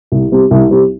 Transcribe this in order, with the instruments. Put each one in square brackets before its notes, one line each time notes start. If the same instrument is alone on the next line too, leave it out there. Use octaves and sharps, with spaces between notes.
[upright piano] C2
C3 G3 C4
C2
C3 G3 C4